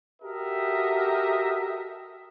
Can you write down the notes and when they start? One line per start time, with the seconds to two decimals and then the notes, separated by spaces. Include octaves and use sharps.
0.23 F#4 G4 A4 A#4 D#5 E5